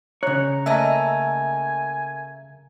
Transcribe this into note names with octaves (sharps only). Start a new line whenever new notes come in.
C#3 C#5 A#5 F#6
A3 A#3 D#5 E5 G#5 A#5